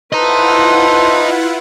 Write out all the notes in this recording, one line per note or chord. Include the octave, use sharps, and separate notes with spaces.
E4 F4 A4 B4 C5 D#5 F#5 A#5